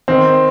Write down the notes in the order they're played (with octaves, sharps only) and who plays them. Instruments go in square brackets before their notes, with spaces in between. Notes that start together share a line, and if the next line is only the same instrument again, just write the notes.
[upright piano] D#3 [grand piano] C4